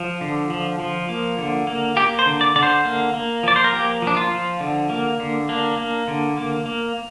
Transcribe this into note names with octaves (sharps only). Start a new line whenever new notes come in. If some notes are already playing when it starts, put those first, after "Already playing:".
Already playing: F3
D3
F3
F3
A#3
D3
A#3
A#3 G4
C5
D3
D5
D3 D5
C5
A#3
A#3
F3 D5
C5
A#4
A#3 G4
F3 D4
F4
F3
D3
A#3
D3
A#3 D4
A#3
D3
A#3
A#3